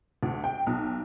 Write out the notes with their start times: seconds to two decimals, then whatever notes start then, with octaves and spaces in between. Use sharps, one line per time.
0.23 D2
0.44 G5
0.67 B1